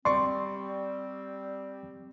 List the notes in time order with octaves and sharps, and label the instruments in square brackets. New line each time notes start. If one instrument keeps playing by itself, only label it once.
[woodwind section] G3 C4 [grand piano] D5 C#6 [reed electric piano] C6